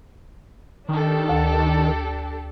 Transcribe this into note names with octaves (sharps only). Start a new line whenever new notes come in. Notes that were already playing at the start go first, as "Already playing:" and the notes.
D#3 D4 G4 A4
D2